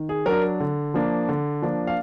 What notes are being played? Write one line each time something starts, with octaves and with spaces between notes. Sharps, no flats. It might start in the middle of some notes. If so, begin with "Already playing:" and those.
Already playing: D#3
G#4
F#3 D4 A#4
D3
F3 A#3 D4
D3
F3 A#3 D4
F5